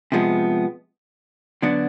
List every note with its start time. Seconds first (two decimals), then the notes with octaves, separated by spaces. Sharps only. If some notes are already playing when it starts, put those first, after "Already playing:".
0.12 C3 F3 G#3 B3
1.62 D3 F#3 B3 D4